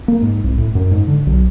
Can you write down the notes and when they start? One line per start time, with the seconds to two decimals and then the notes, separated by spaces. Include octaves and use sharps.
0.08 A#3
0.22 G#2
0.44 C2
0.58 A2
0.75 F#2
0.91 G#2
1.07 D3
1.27 B1